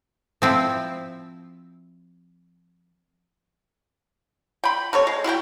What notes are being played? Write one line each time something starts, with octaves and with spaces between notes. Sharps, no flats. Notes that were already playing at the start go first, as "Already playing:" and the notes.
F3 C4 E4
G5 B5
C3 A4 C#5
G#3
E4 F#4 A#4 G5